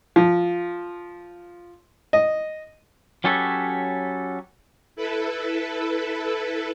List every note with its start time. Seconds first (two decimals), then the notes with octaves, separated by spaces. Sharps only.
0.16 F3
2.13 D#5
3.24 F#3 C#4 G4 A4 B4 C#5
4.96 E4 A4 B4